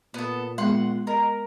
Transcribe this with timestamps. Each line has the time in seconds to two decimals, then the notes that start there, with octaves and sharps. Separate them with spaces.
0.14 A#2 B3 A4
0.58 G#3 B3 G#4 F#5 C6
1.07 A#4 D#5